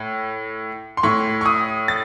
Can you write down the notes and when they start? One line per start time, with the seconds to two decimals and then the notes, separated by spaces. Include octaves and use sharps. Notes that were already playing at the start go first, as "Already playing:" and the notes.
Already playing: A2
0.97 C6
1.03 A2 C#6
1.41 C#6
1.46 D#6
1.88 A6